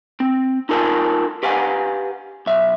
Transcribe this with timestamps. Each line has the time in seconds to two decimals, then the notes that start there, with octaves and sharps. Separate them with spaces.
0.20 C4
0.69 D#4 F4 A4 A#4 G#5
1.43 G4 B4 F5 F#5 G#5
2.46 B1 E5